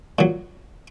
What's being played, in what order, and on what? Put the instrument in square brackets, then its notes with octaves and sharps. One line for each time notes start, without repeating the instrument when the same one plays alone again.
[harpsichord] A#2 F#3